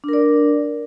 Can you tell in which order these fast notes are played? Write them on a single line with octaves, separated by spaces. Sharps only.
D4 A#4 D5